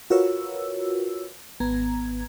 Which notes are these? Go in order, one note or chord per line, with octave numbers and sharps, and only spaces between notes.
F4 F#4 A#4 B4 C#5 E6
G#1 B3 A#5 G#6